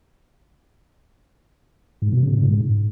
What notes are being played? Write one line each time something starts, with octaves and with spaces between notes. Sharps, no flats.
G#2
B2
C#3
A2
G#2